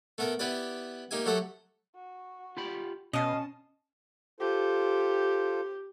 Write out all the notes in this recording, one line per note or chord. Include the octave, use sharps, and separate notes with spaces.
A3 B3 A4 A#4
B3 E4 G4 B4 D5
A#3 D#4 G4 E5 G#5
F#3 A3 G4 A4 E5 F#5
F#4
F4 G4 B5
B2 C#4 D#5 F5 A5
F4 G4 A4 C5